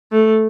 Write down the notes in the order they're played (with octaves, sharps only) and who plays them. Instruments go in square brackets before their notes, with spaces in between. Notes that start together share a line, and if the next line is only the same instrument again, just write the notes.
[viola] A3